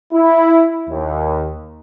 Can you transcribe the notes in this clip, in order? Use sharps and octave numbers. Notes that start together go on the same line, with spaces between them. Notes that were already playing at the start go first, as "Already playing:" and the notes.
E4
D#2